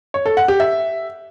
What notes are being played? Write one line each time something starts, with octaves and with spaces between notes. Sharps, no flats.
C#5
A4
F#5
G4
E5